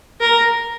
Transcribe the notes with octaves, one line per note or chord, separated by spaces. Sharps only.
A#4